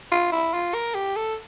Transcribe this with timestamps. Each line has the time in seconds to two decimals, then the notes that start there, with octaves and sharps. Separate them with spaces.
0.11 F4
0.32 E4
0.53 F4
0.74 A#4
0.94 G4
1.16 A4